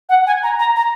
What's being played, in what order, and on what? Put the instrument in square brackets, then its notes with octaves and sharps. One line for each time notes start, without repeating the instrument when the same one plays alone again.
[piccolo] F#5
G#5
A#5
A#5
A#5